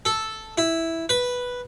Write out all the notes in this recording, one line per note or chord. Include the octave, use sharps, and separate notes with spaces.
A4
E4
B4